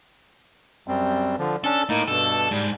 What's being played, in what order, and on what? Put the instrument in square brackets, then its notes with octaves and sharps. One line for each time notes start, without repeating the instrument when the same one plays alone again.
[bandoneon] F#2 G3 C4
D3 F3
[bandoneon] C#4 D4 [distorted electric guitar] A4
[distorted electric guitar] A2 [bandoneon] A#3 D#4
[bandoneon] G2 B2 [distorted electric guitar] A4
[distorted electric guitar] G#2 [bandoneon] G3